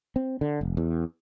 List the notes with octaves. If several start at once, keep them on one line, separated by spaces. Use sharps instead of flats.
C4
D3
F1
E2